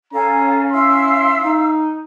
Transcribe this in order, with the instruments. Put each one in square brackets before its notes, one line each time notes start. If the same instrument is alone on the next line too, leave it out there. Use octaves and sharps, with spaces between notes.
[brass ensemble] C#4 [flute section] A4 F5 G#5 [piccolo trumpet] A#5
[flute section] E4 F5 E6 [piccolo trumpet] C6
[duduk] D#4